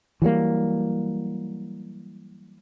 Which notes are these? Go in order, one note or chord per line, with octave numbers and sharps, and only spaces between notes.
E3 F#3 G3 A#3